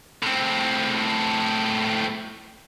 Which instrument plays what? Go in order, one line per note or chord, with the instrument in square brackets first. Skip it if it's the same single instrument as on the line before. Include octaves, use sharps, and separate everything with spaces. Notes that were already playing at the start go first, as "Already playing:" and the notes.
[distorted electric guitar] A2 C4